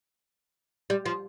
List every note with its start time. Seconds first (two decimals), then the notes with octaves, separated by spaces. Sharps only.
0.90 G3
1.06 F3